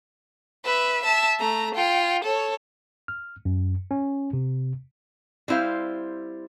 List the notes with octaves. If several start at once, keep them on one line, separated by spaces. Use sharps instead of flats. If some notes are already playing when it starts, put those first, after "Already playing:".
B4 E5
E5 A5
A3 A#5
F4 G5
A4 C#5
F6
F#2
C#4
C3
G3 C4 E4 C5 F5